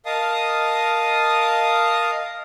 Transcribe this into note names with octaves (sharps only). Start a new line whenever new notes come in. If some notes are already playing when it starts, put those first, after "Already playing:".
A#4 D#5 F5 A5 D#6